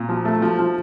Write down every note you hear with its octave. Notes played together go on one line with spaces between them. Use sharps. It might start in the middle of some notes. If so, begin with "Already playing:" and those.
Already playing: A#2
F3
A3
F3
F3